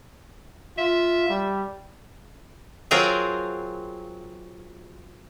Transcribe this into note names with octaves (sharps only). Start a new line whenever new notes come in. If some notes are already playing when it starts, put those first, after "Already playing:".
F4 E5
G3
F#3 C4 F4 G#4 A#4 G5